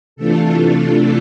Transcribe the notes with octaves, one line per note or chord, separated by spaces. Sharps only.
C3 E3 A3 D4 F4 A4